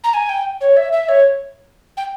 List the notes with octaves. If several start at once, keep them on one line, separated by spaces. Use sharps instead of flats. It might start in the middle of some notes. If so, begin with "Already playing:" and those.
A#5
G#5
G5
C#5
E5
E5
C#5
G5